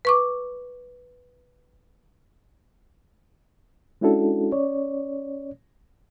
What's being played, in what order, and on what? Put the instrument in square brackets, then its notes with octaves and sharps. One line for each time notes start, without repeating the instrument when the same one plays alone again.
[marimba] B4 C#6 D6
[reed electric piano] G#3 C#4 D4 E4 F#4 A4
C#4 C#5 D5